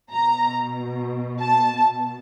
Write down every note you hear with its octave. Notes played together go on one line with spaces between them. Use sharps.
B2 A#5
A5